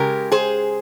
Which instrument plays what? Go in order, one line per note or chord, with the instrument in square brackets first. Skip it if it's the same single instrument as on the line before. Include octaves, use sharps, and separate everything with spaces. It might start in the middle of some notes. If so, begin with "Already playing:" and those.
Already playing: [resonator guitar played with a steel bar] C#3 G#3 G4 A#4
G#4 C5